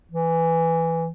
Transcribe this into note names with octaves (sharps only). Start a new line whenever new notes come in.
E3